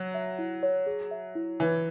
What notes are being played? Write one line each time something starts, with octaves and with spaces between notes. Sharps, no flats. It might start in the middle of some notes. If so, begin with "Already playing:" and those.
Already playing: F#3
E5
E4
C#5
G#4
E5
E4
E3 C#5